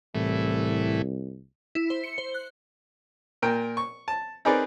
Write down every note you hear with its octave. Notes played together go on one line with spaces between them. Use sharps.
C2 A2 E3
E4
C5
C#7
C5
F#6
A#2 A#4 G5
C#6
A5
C4 D#4 G#4 A#4 B4 D5